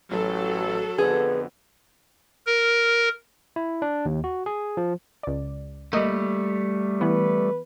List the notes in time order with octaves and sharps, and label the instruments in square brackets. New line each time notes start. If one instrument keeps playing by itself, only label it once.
[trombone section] A1 [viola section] F#3 A4
[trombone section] F2 D3 B3 [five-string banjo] G#4 [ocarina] B4
[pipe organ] A#4
[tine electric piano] E4
D4
D#2
F#4
G#4
F3
[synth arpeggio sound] C#2 D5
[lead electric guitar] G3 A3 [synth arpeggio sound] A#3 D#5
[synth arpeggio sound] E3 B3 [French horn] B4